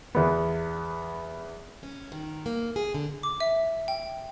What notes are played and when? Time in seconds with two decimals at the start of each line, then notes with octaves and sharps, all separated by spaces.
0.15 E2 B3
1.83 C#4
2.12 D#3
2.46 A#3
2.76 G#4
2.94 D3
3.23 D6
3.40 E5
3.88 G5